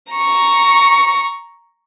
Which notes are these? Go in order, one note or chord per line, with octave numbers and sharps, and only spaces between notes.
A#5 C#6